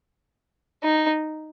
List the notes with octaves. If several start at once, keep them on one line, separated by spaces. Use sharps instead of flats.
D#4